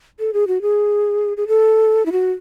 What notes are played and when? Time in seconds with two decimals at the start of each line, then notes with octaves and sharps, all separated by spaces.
0.20 A4
0.33 G#4
0.48 F#4
0.62 G#4
1.37 G#4
1.48 A4
2.06 E4
2.12 F#4